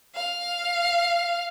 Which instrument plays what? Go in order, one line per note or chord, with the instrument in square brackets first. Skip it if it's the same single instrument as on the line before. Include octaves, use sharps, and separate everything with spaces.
[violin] F5